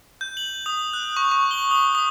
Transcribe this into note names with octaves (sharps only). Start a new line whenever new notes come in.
G6
F#7
D#6
F#6
C#6
C#6
G7
D#6
D#6